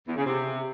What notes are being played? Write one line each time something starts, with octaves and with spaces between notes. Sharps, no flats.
E2
C#3
C3